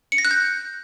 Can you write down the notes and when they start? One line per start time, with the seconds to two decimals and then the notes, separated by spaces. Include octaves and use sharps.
0.12 C#7
0.18 A#6
0.25 F#6
0.31 G6